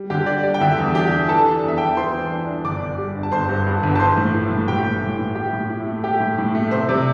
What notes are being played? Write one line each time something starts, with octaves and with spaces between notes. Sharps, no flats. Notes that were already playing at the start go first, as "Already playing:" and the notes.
Already playing: G3
D3 G4 G5
D4 D5
G3 D5
G5
D3 E4 E5
E2
D4 G4 G5
D4
E3 A4 A5
D4
E2 E5
E2 G5
A5
E3 C5 C6
E3
D4
D4
G1 D5 D6
G1
G3
G1
A5
G1 C5 C6
G2
G2
G1
A5
E3 C5 C6
A2
E3
A2
A2 G4 G5
A2
A2
A2
E4 G4 G5
A2
E4
A3
A3 G4 G5
A2
A2
A3
C3 C5
C3 D5